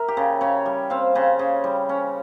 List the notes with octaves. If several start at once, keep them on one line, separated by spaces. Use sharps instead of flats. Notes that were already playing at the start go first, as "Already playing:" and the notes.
Already playing: A#4 E5
G4
C#3
C#3 C#5
G3
C4 F5
C#3 C5
C#3
G3
C#4